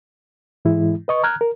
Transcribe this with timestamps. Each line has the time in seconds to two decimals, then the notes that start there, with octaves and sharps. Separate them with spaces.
0.65 G#2 E3 G#3 E4
1.08 B4 D#5 C#6
1.23 A#5 F6 F#6 G#6
1.41 A#4